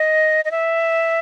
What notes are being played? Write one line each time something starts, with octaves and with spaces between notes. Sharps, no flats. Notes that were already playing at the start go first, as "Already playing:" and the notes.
Already playing: D#5
D#5
E5